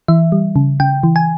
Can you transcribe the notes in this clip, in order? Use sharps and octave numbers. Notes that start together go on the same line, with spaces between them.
E3 E5
G3
C#3
C#3 G5
E3
G#5